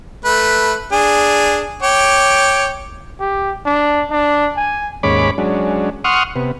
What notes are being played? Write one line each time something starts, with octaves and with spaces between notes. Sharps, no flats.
A3 B4
D4 G#4
C#5 G5 D6
G4
D4
D4
G#5
D#2 G#2 C#4 C#5 B5 D6
F#3 G#3 C#4 D4
F#5 C6 C#6 D#6 F6
C3 B3